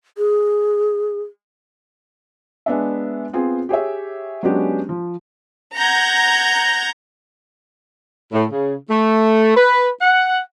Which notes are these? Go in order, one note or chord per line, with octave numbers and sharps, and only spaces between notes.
G#4
G#3 B3 D4 E5
B3 C4 F4 G#4
G4 G#4 C#5 E5
F#3 G#3 B3 C#4 D4 G4
F3
F#5 A#5 G6 G#6 A#6
A2
C#3
A3
B4
F#5